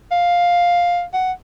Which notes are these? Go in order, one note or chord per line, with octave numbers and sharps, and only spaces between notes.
F5
F#5